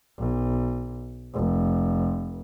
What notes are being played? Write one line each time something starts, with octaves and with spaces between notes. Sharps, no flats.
B1
F1